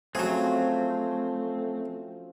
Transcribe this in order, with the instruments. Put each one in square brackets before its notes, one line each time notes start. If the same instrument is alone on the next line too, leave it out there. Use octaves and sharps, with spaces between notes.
[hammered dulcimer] F3 C#4 [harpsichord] F#3 G#4 [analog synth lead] A3 [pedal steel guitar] C4